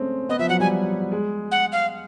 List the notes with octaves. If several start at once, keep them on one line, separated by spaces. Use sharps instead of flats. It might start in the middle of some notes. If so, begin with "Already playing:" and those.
Already playing: G#3 A3 C4 C#4
B3 D#5
F3 E5
F#3 F#5
G3 G#5
G#3
F#5
F5